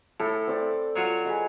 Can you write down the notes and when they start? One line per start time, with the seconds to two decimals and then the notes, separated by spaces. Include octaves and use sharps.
0.20 A2 A4
0.48 C4 D5
0.96 F#3 F4 F#4
1.25 G#4 B4 D#5